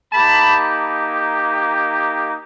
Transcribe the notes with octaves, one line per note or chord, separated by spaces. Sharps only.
A#3 D#4 G4 A5 B5